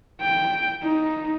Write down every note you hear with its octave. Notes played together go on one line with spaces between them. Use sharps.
G5
D#4